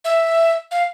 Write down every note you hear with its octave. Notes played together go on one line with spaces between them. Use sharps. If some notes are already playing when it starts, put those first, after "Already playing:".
E5
F5